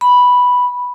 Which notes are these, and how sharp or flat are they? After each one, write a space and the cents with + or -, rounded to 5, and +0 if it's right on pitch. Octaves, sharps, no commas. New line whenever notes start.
B5 -5